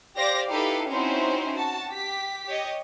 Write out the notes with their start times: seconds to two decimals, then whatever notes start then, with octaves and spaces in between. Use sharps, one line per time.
0.16 G4 C5 D5 F5 A#6
0.49 D#4 E4 G4 A4 B4 F5
0.90 C4 C#4 D#4 E4 F#4 C5
1.52 F#4 A5
1.89 G4 B6
2.46 G4 C#5 D#5